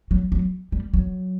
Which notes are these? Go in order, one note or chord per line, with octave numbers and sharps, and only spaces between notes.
F#3
F#3
G3
F#3